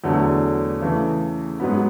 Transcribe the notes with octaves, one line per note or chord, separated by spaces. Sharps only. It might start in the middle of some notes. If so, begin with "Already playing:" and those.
E2 D3 F#3 A3
C#3 E3 A3
G#2 F#3 B3